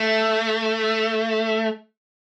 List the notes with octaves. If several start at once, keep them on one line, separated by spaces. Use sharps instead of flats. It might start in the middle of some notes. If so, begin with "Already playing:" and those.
Already playing: A3